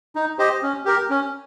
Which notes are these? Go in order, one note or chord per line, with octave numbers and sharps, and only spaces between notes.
D#4
G4 C5 D#5
C#4
G4 A#4
C#4